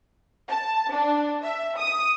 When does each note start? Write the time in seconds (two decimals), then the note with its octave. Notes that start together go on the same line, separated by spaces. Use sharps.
0.50 A5
0.91 D4
1.42 E5
1.77 D#6